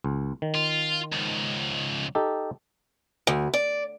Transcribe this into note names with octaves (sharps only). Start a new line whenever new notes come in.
C#2
D#3
F4
C#2 G#2
D#4 G4 A4
D2
D5